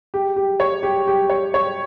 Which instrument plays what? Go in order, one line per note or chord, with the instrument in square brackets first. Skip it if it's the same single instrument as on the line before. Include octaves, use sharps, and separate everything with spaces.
[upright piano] G4
G4
C#5
G4
G4
C#5
C#5